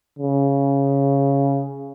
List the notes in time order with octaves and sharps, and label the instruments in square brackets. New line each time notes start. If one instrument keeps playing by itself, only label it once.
[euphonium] C#3